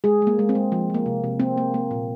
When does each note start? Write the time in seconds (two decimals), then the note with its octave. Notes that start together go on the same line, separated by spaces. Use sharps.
0.04 G#3 G#4
0.22 G#3
0.27 A#3
0.39 G#3
0.49 C4
0.55 G#3
0.72 F3
0.90 F3 A#3
1.06 C3
1.24 C3
1.40 A#3 C4
1.58 A#3
1.74 A#3
1.91 A#2